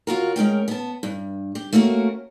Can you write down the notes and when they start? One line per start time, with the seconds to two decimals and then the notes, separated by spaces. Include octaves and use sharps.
0.07 C#3 F4 F#4 A#4
0.36 G#3 C#4 A#4 G5
0.68 B3 A5
1.03 G2
1.55 G4
1.73 A3 A#3 C#4 E4 F#4 A#4